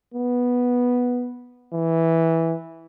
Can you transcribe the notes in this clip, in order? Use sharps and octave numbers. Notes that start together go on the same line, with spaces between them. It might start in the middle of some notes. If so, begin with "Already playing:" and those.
B3
E3